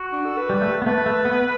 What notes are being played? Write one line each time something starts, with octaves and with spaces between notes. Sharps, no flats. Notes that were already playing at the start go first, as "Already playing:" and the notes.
Already playing: F#4
D4
A4
B4
G3
A3
B3
A3 B4
A3
B3